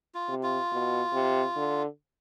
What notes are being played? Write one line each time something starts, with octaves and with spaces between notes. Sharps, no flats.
F4
C3
F4
B2
C3
D3